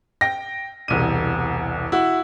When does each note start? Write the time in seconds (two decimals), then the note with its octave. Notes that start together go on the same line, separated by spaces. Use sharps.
0.21 G5 A#6
0.88 E1 C2 D#7
1.92 E4 F#4